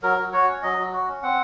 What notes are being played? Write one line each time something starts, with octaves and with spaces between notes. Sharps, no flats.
F#3 A#4
F#3
F#4 C#5
C#4
F#3 D#5
F#3
F#4
C#4
C4 F#5